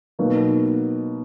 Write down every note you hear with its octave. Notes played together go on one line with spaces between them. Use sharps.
B2 F#3 A#3 D#4